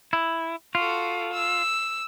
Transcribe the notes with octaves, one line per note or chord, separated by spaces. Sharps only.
E4
F4 F#4 A4
E6